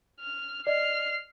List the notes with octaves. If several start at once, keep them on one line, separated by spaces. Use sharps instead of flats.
F6
D5 D#5 F6 C7